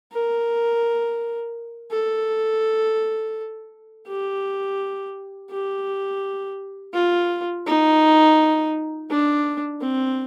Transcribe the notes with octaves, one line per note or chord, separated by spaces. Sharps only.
A#4
A4
G4
G4
F4
D#4
D4
C4